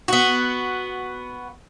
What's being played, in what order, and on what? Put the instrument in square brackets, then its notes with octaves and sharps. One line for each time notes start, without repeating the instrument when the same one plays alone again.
[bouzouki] B3 F#4